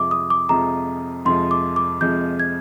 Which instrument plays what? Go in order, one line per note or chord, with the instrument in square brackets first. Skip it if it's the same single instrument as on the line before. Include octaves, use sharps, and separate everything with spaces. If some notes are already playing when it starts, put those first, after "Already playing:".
Already playing: [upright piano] F2 C3 F3 G#3 [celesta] D6
[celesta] D#6
D6
[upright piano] F2 C3 F3 G#3 [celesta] A#5
[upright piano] F2 C3 F3 G#3 [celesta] C6
[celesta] D6
D6
[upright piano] F2 C3 F3 G#3 [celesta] G6
[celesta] G#6